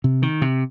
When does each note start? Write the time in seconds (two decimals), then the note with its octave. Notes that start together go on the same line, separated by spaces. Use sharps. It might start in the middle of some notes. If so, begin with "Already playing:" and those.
0.04 C3
0.22 D#3
0.42 C3